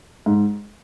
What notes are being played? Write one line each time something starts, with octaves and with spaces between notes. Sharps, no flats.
G#2